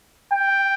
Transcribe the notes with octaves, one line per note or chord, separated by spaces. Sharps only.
G5